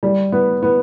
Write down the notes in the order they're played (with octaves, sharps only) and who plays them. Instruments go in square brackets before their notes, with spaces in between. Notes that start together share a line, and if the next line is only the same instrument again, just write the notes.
[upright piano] G3
B3
B3